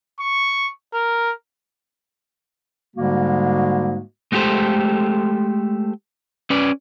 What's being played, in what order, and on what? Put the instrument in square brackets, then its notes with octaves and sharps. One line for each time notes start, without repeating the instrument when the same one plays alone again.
[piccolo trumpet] C#6
A#4
[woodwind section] G#2 D3 G3 G#3 A#3 F#4
[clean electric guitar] G#3 A3 B3 G4 A4 C5
C#4 B4 D5